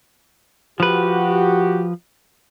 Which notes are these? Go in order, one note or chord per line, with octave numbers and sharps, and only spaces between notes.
F3 F#4 G4 B4